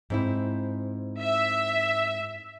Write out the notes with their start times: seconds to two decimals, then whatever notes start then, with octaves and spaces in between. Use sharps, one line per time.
0.10 G#2 C4 E4
1.18 E5